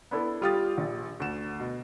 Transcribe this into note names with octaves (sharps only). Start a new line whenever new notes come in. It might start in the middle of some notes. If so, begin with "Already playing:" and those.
B3 D4 E4 A4
G3 F4 G4 D#6 F6 A6
A#1
D2 E7
B2